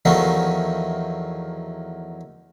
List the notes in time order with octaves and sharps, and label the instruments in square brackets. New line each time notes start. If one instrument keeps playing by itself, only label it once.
[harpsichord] E2 D#3 F3 F#3 A3 E4